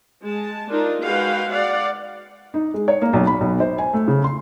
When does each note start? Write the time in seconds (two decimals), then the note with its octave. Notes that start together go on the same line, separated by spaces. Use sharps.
0.22 G#3 A5
0.69 D4 D#4 F4 A#4
1.01 G#3 F#4 B4 F5 G5
1.49 D5 F5 F#5
2.54 D#4
2.74 G#3
2.88 C#5
3.02 A#3
3.13 B1
3.27 B5
3.41 B1
3.60 C5
3.78 G#5
3.94 A3
4.08 C#3
4.24 C6